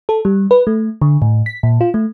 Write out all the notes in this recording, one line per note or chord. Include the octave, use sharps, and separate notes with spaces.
A4
G3
B4
A3
D3
A2
B6
A#2
F4
A3